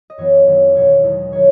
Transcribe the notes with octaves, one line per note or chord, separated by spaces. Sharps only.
D#5
F#2 E3 B3 C#5
F#2 D#3 F#3
E2 B2 F#3 B3 C#5
E2 D#3 G#3 B3
D#3 F#3 C#5